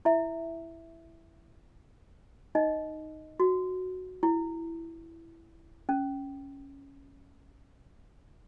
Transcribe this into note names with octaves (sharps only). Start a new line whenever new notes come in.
E4 E5
D#4 D#5
F#4
E4
C#4